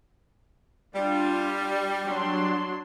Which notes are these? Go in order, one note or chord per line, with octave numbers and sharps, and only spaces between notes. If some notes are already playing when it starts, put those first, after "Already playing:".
G3 D4 F4
F#3 D4 C6